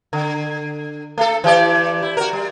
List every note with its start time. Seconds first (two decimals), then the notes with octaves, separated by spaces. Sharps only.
0.13 D3
1.18 A3 A4
1.44 E3 G4 D5
2.02 E4
2.17 F#4 A#4
2.33 G3